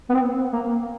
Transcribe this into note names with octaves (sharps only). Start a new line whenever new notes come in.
B3
C4
A#3